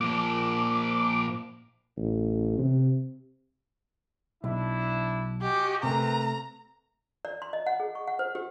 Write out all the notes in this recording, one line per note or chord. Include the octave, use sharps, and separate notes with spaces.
A#2 F3 D6
A1
C3
B1 D4 E4
F#4 G4 D#5 G#5
C3 A3 C4 A#4 B4 A#5
D5
C6
D#5
F#5
G#4
C#6
F#5
C5
G4